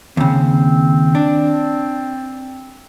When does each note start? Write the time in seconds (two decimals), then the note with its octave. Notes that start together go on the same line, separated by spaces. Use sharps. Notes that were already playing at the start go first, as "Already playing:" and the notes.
0.17 D#2 C#3 C4
1.15 D4